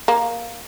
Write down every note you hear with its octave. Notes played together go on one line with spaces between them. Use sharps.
A#3